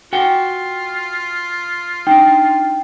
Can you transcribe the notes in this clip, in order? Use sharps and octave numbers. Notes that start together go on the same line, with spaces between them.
F4 F#4 F#5 G5
D4 D#4 G5